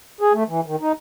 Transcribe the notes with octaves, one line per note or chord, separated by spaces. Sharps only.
G#4
A3
E3
D#3
D#4